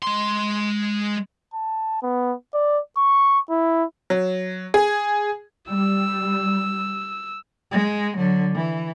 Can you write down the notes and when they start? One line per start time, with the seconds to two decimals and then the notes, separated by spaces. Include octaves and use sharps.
0.03 G#3 C6
1.54 A5
2.02 B3
2.54 D5
2.97 C#6
3.50 E4
4.10 F#3
4.74 G#4
5.70 G3 E6
7.71 G#3
8.17 D3 F#3
8.55 E3